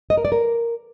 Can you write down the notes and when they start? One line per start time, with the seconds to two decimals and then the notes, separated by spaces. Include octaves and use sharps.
0.10 D#5
0.17 A#4
0.25 D5
0.32 A#4